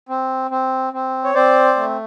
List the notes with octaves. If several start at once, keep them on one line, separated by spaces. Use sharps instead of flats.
C4
C4
C4
C#5
C4 C5 D5
A3